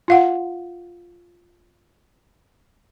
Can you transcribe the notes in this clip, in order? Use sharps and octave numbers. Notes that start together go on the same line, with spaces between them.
F4 F5 F#5